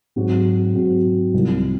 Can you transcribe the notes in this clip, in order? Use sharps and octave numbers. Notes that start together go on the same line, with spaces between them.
G#2 F#3 C4 F#4
G#2 F#3 C4 F#4
C2 C3 F3